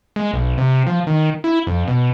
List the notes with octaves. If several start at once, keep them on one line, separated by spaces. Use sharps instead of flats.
G#3
B1
C3
F3
D#3
E4
F2
B2